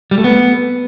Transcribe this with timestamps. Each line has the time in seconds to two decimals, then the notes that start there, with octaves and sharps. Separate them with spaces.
0.11 G3
0.18 A3
0.24 B3